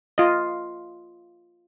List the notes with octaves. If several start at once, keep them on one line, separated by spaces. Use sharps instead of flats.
F4 D#5